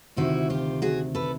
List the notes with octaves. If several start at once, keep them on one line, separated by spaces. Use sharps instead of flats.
D2 C3 D#3 E4 F#4
F4 G4
F#4 G#4
A4 B4